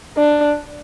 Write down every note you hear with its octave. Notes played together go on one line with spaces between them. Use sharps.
D4